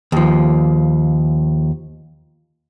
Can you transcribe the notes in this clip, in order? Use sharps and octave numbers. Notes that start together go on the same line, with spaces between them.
D#2 F3